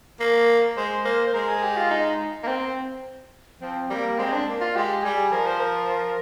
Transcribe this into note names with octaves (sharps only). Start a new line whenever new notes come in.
A#3
G#3 C5
A#3 C5
C5
G#3 A#4
G#4
G4
F4
D#4
A#3
C4
F3 C4
G3 A#3
G#3 C4
D4
A#3
F4
G#3 G4
G3 G#4
F3 A#4
C5
A#4